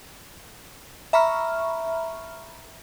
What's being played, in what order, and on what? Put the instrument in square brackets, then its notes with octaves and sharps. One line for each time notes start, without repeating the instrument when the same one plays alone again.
[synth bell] E5 A#5 B5 C#6 F6